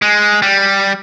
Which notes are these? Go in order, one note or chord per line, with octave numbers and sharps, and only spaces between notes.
G#3
G3